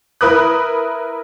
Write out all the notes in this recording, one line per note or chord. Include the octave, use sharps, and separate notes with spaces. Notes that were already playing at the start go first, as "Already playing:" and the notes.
E4 A#4 B4 D#6 F#6